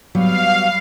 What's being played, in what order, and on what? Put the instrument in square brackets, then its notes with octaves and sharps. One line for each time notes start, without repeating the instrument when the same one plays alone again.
[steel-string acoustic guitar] F#3 G3 B3 [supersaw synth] F5